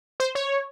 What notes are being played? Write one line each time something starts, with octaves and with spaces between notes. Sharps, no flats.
C5
C#5